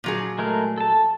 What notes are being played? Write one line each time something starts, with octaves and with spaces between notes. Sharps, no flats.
A#2 F#3 G#4
G#3 A3 A#4
A4 A5